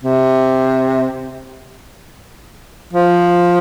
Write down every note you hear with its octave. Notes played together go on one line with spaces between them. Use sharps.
C3
F3